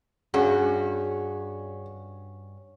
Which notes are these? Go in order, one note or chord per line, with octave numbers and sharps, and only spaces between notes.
G2 C#4 F#4 G#4